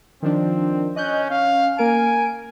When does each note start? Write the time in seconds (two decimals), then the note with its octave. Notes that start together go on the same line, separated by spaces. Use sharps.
0.22 D#3 F3 C4 D4
0.96 C#4 D#5 F#6 G6
1.30 C#4 F5
1.78 A#3 A#4 G#5 D7